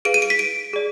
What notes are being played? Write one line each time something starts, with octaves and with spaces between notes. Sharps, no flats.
G#4 B4 F5 D7
D#7
D7
B6
D7
G#4 D5